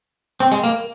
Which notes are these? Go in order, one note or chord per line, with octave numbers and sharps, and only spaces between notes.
C4
G#3
A#3